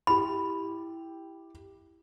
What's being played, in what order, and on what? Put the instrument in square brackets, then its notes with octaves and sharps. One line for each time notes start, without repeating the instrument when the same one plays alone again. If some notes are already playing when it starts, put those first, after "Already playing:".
[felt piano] E4 G4 [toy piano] B5